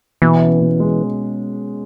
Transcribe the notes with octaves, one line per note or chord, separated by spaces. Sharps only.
B2 E3
C#4
B2
G#3